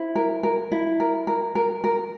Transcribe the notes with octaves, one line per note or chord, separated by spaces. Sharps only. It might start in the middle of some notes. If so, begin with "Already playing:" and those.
Already playing: E4 C5
A#4
A#4
E4
A#4
A#4
A#4
A#4